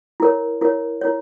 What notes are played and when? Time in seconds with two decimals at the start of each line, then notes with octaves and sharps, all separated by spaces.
0.20 E4 A#4 C#5
0.61 E4 A#4 C#5
1.01 E4 A#4 C#5